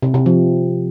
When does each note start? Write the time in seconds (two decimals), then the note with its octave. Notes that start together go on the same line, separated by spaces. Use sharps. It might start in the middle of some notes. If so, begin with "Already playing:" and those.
0.02 C3
0.14 C3
0.26 F3